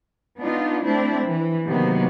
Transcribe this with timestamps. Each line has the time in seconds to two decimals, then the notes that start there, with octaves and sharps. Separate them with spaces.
0.39 B3 D4 D#4 F4
0.85 A3 C4 D4 E4
1.27 E3
1.68 C3 D#3 F#3 A#3 B3